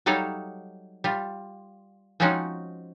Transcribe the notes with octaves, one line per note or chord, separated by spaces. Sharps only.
F#3 G3 D#4 A4 C#5 F5
G3 F4
F3 G#3 C4 C#4 D#4 F#4